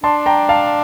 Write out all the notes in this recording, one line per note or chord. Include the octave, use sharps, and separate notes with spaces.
D4 A5 C6
G5 A#5
F5 A5